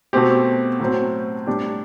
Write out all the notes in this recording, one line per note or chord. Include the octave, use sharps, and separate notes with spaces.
B2 A3 C4 G4
A2 F#3 C4
A2 G3 D4 G4